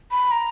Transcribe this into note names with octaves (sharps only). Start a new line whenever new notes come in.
B5
A#5